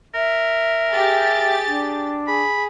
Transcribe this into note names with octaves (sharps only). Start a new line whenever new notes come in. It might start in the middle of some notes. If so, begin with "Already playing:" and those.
A#4 E5
G4 G#4 A6
D4
G#4 B5